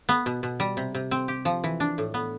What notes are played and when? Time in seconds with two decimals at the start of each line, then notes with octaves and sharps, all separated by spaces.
0.09 B3
0.26 B2
0.43 B2
0.60 G3
0.77 C3
0.95 C3
1.11 C4
1.28 G4
1.45 F3
1.64 E3
1.80 D4
1.98 A2
2.14 B3